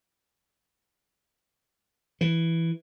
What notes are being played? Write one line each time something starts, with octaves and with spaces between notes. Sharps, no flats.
E3